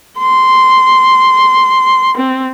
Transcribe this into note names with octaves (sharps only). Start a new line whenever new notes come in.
C6
C4